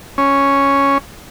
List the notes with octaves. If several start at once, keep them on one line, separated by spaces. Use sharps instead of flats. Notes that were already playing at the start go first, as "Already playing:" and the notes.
C#4